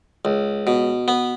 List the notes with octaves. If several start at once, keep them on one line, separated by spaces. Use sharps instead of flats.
C#2
B2
B3